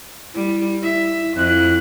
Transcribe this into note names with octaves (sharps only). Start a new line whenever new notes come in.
G3 E4
E4 E5
F2 E4 F#6